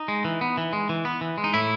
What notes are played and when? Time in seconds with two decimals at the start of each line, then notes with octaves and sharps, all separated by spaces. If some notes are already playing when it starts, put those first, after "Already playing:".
Already playing: D#4
0.08 G#3
0.25 E3
0.41 B3
0.57 E3
0.73 G#3
0.89 E3
1.05 B3
1.21 E3
1.38 G#3
1.44 D#4
1.54 A2 E4